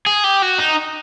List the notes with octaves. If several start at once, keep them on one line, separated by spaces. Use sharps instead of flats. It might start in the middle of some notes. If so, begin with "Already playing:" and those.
G#4
G4
F#4
D#4